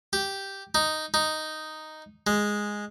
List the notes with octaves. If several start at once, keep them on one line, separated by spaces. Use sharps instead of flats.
G4
D#4
D#4
G#3